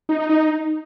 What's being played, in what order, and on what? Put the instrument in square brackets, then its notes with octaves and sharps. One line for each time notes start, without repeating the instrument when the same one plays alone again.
[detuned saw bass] D#4
D#4
D#4